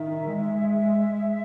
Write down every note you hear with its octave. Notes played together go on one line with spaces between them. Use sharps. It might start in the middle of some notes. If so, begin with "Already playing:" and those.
Already playing: D#3 E5
G#3
E5